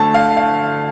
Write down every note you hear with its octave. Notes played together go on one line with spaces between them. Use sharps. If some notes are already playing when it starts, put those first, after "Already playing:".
Already playing: D2 D3 A3 A5
F5
F5